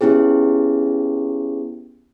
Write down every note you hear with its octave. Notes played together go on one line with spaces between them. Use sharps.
B3 C#4 E4 G4 G#4